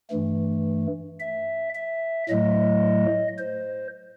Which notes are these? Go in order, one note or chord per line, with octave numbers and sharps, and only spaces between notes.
G2 E3 A3
E5
E5
A2 F#3 A3 D#5
C5